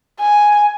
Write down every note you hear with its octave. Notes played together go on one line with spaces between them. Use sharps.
G#5